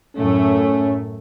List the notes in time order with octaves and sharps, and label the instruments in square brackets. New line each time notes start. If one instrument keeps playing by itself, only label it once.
[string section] F#2 A2 A3 [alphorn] C#4